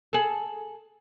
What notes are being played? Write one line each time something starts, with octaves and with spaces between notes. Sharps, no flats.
G#4 A4